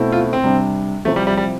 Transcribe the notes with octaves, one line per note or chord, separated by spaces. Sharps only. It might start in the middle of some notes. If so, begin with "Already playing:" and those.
Already playing: B2 A3 C4 E4
F4
C4
C3 G3 D4
C3 F3 A3 C4 E4
G3
G3
G3